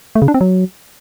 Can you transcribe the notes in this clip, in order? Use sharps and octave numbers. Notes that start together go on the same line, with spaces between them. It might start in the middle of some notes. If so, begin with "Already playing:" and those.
A3
C#3
D4
C4
F#3